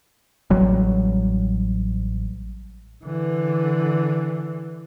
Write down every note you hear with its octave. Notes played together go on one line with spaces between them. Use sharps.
A1 F#3 G3
D3 E3